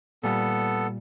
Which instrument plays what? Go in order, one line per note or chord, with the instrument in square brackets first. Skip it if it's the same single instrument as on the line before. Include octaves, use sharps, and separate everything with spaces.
[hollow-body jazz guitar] A#2 G3 [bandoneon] B3 A4